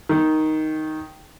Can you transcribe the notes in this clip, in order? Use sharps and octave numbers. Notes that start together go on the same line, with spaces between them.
D#3